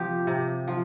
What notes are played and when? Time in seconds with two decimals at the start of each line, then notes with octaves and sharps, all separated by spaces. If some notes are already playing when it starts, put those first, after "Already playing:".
Already playing: C3 F3 G4
0.27 C3
0.68 F3